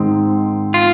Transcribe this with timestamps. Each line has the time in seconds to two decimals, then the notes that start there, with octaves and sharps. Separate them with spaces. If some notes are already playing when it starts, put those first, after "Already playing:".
Already playing: G#2 D#3 G#3 C4
0.74 F4